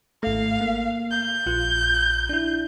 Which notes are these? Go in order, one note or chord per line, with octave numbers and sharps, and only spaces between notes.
G#1 A3 F5
A#3
G6
A#1 F4 F#6
D4 E4